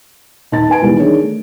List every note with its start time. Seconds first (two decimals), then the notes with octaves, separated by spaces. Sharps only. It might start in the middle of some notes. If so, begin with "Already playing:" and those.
0.52 D#1 D#4 A5 A6
0.68 D#4 B4 G#5 D7
0.81 D#2 B2 E3 G3 G#3
0.99 D#3 D4 G#4 A#4 C#5
1.23 A3